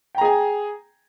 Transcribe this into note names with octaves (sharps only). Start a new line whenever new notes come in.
G#4 G5 G#5 A#5